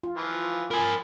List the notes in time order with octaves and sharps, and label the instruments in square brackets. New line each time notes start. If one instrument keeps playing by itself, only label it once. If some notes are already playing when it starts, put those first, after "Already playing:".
[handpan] F4
[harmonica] E3 F3
[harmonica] F3 B5 [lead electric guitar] A#4 G#5